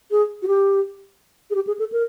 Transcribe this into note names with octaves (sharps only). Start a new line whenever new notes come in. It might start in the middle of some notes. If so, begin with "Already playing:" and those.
G#4
F#4
G4
G#4
G4
G#4
A4
A#4